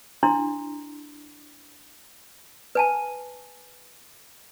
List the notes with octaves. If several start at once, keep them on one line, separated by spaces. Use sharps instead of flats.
D4 E4 A#5 C6
B4 G#5 A5